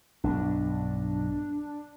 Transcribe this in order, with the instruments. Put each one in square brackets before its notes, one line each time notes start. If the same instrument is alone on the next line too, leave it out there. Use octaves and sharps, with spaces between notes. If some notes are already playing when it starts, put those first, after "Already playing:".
[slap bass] B1 G2 [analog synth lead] D4